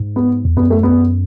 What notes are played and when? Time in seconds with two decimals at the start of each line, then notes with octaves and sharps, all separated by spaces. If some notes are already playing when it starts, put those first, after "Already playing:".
Already playing: G#2
0.16 B3
0.45 E2
0.57 F#2 B3
0.70 A3
0.83 B3